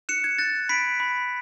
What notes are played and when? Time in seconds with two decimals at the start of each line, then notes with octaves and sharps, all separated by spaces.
0.09 F#6 C#7 E7
0.24 G#6
0.38 F#6 A6
0.69 B5 B6 D7
1.00 B5